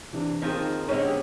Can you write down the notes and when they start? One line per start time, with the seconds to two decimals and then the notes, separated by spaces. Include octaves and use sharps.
0.12 C3 E3 D4
0.42 D#2 D#3 F3 C4 D#4 G#4
0.89 D3 G#3 C4 C#4 C#5
1.03 B3 G4